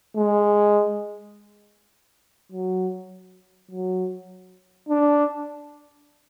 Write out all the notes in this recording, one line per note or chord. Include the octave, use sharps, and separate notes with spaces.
G#3
F#3
F#3
D4